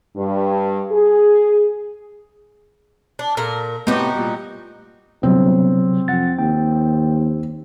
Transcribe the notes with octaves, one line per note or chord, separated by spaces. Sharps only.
G2
G#4
D4
A#2 A4 A#4
A2 C3 B3 D#4 F#4 G4
A#2 G3
G1 C3 F#3 C4
F2 F#5 A6
D#2 G5